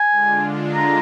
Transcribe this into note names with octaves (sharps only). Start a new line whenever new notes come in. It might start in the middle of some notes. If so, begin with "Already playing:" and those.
Already playing: G#5
D3 G#3 D4 F4
A#5